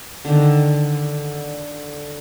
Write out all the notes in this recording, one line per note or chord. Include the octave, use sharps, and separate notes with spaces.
D3 D#3